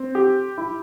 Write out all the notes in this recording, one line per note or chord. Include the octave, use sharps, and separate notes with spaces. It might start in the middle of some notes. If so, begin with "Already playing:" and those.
Already playing: C4
G4
E4